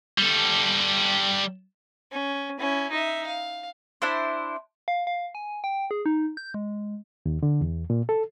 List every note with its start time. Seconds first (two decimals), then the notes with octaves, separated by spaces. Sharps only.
0.18 G3 A4
2.12 C#4
2.59 C#4 E4
2.91 D#4 E5
3.27 F5
4.02 D4 E4 C5
4.88 F5
5.07 F5
5.35 G#5
5.64 G5
5.91 G#4
6.06 D#4
6.37 G6
6.54 G#3
7.26 D#2
7.43 D3
7.61 E2
7.90 A#2
8.09 A4